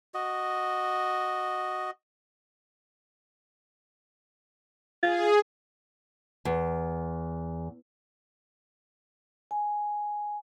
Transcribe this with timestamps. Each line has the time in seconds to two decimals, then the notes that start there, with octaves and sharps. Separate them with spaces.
0.14 F#4 D#5
5.03 F4 G#4
6.45 E2
9.51 G#5